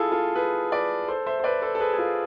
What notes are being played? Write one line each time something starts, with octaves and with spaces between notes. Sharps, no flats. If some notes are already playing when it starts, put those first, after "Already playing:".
Already playing: E4 F4 G#4 A4
F4 A4
G#4 B4
B4 D5
A4 C5
C5 E5
C5
B4 D5
A4 C5
A4
G#4 B4
G#4
F4 A4